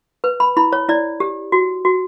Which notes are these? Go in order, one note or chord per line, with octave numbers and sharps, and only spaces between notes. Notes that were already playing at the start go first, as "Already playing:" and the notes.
B4
B5
E4 B5
C#5
E4 D5
G4
F#4
F#4